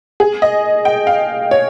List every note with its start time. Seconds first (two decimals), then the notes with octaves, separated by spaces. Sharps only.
0.20 G#4
0.42 D#5
0.85 G5
1.07 F5
1.51 C#5